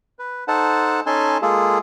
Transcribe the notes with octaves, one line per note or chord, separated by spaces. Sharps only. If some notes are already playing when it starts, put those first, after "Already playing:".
B4
D#4 A4 C5 F#5 A5
C#4 D#4 A4 G#5 A5 C6
G#3 A#3 F4 G#4 A4